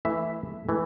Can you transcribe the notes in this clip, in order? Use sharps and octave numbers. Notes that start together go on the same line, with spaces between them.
E3 A3 E4 E5
E3 A3